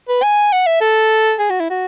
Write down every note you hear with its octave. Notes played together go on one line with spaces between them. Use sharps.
B4
G#5
F#5
E5
A4
G#4
F#4
E4
F#4